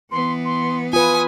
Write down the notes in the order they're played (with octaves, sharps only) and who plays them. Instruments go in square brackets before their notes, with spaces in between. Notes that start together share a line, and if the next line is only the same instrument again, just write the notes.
[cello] E3 B3 [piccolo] C6
[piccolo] C6
[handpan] F4 B4 [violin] G#5 [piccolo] D#6